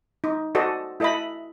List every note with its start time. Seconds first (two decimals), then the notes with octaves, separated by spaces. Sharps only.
0.24 D#4
0.55 F#4 A4 C5 D5 D#5
1.00 E4 A4 D#5 E5 B5